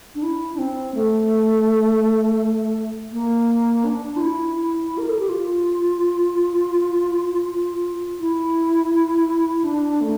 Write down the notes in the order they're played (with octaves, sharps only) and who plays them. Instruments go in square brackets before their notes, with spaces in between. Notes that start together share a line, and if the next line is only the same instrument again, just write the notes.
[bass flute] D4
E4
D4
C4
A3
A#3
D4
F4
E4
E4
A#4
A4
G4
F4
E4
D4
A3